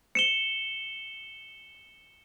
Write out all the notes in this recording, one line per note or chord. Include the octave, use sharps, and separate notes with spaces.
C#7 E7 G7